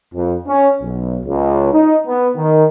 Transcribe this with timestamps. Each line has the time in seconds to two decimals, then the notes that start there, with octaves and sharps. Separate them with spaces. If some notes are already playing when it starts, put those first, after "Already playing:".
0.15 F2
0.47 C#4
0.82 B1
1.26 C#2
1.73 D#4
2.07 B3
2.36 D#3